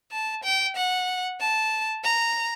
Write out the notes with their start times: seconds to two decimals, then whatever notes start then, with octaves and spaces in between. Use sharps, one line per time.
0.12 A5
0.44 G5
0.76 F#5
1.40 A5
2.04 A#5